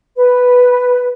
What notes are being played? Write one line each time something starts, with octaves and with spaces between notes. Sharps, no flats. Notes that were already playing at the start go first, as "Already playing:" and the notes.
B4